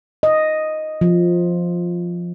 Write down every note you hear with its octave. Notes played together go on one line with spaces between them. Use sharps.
D#5
F3